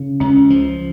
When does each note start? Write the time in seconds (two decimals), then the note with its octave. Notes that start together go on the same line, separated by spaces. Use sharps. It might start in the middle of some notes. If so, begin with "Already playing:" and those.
Already playing: C#3
0.20 C#2 C#4
0.50 F3